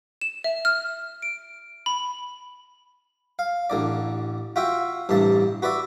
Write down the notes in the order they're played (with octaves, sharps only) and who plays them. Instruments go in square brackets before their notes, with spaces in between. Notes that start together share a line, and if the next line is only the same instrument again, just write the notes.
[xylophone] E7
E5
F6
D7
B5
[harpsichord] F5
A1 D3 D5
F4 F#4 E5 G5
A1 G2 C3 A5
F#4 B4 D5 E5